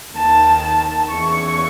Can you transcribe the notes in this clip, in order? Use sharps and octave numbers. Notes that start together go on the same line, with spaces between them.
D#2 D#3 A5
A5
E2 C#3 E3 C#6